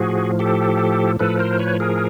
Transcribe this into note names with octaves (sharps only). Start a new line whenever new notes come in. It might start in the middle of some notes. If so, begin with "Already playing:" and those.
Already playing: A2 F3 F#4 G#4
G4 A4
A2 F3 A4 B4
A#4 C5
B4 C#5
G#4 A#4